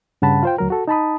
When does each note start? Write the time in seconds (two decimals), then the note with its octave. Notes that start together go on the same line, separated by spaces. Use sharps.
0.22 G2 C#3 F#5 A5 B5
0.43 F4 C5 G5
0.58 D2 F#3 A#4
0.70 F#4 A4
0.88 D#4 A5 B5 D#6